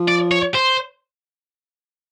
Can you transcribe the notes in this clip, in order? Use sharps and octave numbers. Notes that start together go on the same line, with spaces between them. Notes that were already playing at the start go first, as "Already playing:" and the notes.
Already playing: F3
D5
C#5
C5